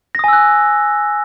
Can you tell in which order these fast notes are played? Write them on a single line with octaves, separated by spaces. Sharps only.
A#6 D#6 G#5 E6 F#6